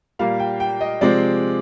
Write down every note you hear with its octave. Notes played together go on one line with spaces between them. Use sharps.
A#2 G3 A#3 F5
G5
G5
D#5
C3 F3 G#3 C4 D5